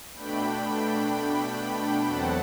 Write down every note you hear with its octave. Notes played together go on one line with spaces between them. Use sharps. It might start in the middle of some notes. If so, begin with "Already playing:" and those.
B2 A3 D4 G5 B5
E2 B2 F#3 C4 F#5 A5